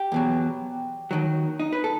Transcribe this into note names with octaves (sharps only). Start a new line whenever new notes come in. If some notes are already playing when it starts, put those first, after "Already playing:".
Already playing: G4
E2 B2 F#3
D#2 D#3 F#3
D#4
B4
A4